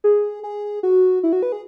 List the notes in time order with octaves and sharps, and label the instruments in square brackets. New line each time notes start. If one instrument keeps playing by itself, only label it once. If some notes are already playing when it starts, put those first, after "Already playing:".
[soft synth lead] G#4
G#4
F#4
E4
F#4
B4
G#4